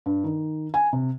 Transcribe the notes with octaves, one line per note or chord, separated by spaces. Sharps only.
G2
D#3
G#5
C3